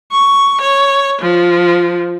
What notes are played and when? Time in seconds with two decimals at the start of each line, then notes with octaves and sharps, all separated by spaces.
0.12 C#6
0.61 C#5
1.22 F3